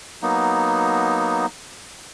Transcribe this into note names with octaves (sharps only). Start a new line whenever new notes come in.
F#3 A#3 B3 D#4